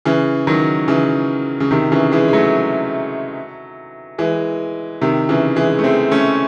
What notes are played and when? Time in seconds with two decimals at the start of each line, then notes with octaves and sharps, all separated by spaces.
0.05 C#3 E3
0.47 D#3 F#3
0.88 C#3 E3
1.60 C#3
1.71 C3 D#3
1.92 C#3 E3
2.11 E3 G#3
2.28 G#3
2.33 F#3 A3
4.18 E3 G#3
5.02 C3 D#3
5.29 C#3 E3
5.56 E3 G#3
5.79 A3
5.84 G#3 C4
6.11 A3 C#4